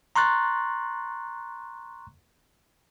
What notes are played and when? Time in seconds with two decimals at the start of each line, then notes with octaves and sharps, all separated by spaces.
0.16 A#5 C6 C#6 F#6 A6